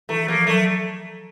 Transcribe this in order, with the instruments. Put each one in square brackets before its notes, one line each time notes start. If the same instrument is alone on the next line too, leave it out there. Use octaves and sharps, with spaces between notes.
[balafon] E3 [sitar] A3
[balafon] F3 [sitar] A#3
[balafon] F#3 [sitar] A3